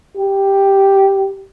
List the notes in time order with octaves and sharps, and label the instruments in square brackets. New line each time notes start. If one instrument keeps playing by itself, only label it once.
[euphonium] G4